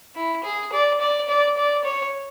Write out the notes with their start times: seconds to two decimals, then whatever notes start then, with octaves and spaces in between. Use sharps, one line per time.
0.15 E4
0.44 G#4
0.73 D5
1.00 D5
1.28 D5
1.57 D5
1.84 C#5